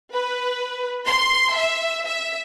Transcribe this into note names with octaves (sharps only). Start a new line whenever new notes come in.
B4
C6
E5
E5